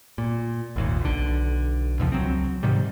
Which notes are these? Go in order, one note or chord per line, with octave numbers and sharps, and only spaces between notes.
A#2
G#1 D#2 A#2
B1 D3
E2 C3 F3
C#2 F#3 C4
G#2 C3 D#3 G3